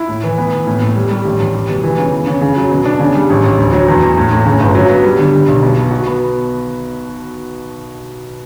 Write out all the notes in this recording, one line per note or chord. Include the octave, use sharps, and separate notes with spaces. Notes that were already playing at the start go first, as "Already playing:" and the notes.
Already playing: E4
A2
E3
B3
E3
A2
A2
G3
G3
A1
A1
G3
B2
E3
C#3
E3
C#3
C#3
F#3
B2
D4
C#3
G3
A1
A1
D2
F#3
E2
E2
A2
A2
C#3
G1
F#3
B3
G3
D3
G3
B1
B2
B2
F#4
B3